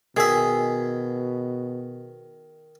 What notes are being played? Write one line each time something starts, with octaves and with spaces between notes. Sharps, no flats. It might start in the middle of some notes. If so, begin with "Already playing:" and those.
B2 D#3 G#4 E5